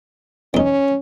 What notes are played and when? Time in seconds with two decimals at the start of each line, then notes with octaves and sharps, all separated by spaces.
0.54 E2 C#4 D#4